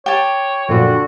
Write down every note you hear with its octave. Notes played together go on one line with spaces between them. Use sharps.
G4 C#5 A5
F#2 A#2 D3 F3 F#4